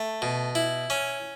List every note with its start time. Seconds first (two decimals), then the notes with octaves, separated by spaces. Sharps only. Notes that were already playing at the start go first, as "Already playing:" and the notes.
Already playing: A3
0.22 B2
0.55 E4
0.90 C#4